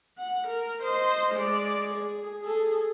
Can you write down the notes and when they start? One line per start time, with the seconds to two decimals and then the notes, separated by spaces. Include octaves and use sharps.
0.18 F#5
0.48 A#4
0.82 C5 D#5
1.35 G#3 D5
1.94 G#4
2.42 G#4 A4